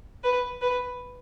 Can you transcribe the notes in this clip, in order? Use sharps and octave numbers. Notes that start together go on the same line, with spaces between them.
B4
B4